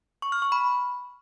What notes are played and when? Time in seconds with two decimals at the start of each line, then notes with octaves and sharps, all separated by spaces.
0.22 C#6
0.32 F6
0.42 C#6
0.52 B5